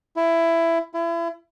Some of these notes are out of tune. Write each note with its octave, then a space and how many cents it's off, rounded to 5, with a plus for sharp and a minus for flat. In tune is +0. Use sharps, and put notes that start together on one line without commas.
E4 +15
E4 +35